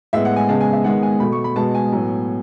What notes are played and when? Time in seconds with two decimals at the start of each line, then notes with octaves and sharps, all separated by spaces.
0.13 A2 G#3 B3 E5
0.25 F#5
0.36 G#5
0.49 C#3 G#3 B3 A5
0.61 G#5
0.73 E5
0.84 D#3 G#3 B3 F#5
1.03 G#5
1.20 B2 A3 B5
1.32 C#6
1.44 B5
1.56 B2 G#3 B3 A5
1.75 G#5
1.92 A2 F#3 B3